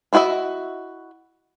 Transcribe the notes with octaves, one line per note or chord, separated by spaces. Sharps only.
D4 E4 F#4 D#5 E5